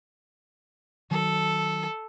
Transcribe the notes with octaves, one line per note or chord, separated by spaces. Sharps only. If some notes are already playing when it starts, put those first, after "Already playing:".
D#3 F#3 A4